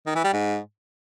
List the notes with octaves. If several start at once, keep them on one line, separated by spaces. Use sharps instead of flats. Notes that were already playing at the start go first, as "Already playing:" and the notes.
D#3
E3
G3
G#2